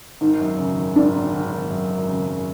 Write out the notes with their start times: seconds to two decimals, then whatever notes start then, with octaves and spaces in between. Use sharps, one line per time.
0.21 G#1 D#4
0.40 F#2
0.59 C#3
0.77 G#1
0.96 G#1 D4
1.15 G#1
1.34 G#1
1.52 G#1
1.71 F#2
1.90 G#1
2.09 C#3
2.27 F#2